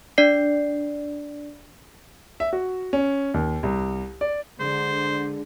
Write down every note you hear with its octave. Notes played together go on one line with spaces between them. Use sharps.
D4 D5 C7
E5
F#4
C#4
D#2
C2
D5
D3 G#3 D4 G#4 C5